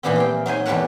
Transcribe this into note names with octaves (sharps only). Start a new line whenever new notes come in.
A#2 E3 F3 G3 B3 C4
F4 C5 G5
F#3 D#4 C5 G#5
E2 B2 G3 A3 A#4 F#5